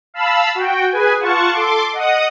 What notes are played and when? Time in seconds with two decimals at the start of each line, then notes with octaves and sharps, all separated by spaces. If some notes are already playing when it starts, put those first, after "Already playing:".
0.14 F5 A5 B5 E6
0.55 F#4 G5
0.91 G#4 B4 G#5
1.20 F4 F#5 A5 C#6
1.53 A4 C6 D6
1.93 D#5 F#5 D#6